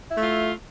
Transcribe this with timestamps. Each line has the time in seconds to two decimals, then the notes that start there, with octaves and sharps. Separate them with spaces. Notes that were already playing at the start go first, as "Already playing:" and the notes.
0.11 E4
0.16 A3
0.20 F4